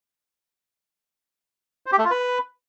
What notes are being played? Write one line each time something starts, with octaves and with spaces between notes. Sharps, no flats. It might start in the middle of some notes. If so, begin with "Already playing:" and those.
C5
G4
A3
F4
B4